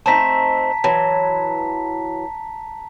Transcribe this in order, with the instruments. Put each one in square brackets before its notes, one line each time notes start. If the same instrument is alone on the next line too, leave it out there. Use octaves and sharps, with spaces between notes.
[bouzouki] A3 C4 D#4 [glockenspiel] A5 A#5 B6
[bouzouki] E3 F#3 [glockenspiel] A5